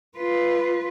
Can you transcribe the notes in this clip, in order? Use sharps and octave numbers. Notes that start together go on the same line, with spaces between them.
F4 B4